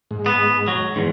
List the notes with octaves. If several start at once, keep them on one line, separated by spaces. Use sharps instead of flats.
G#2
B3
F#3
E2 G#2